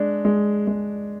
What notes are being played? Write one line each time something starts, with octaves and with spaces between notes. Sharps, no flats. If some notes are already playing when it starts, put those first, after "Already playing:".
Already playing: G#3 D4
G#3
G#3